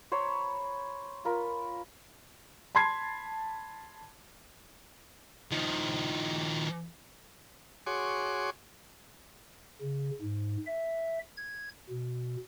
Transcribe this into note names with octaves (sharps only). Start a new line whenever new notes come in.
C5 C#5 A#5 B5
F4 A#4 B5
A5 B5 C6 G#6 C7
D#3 F3
F#4 G#4 C#5 C6 D6
C#3
G#2
E5
G#6
B2